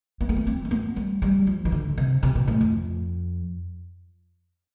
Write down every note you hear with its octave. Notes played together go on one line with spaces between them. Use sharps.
B3
A3
B3
C4
A3
B3
G3
G3
F3
E3
D3
C3
C3
B2
A2
F2